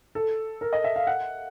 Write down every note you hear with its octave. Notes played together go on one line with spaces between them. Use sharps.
A4
A#4
D#5
E5
F5
F#5